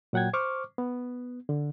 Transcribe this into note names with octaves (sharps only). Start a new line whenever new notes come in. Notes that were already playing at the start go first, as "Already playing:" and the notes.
A#2 F#3 F#5 G5 G#6
C5 C#6 D6 F6
B3
D3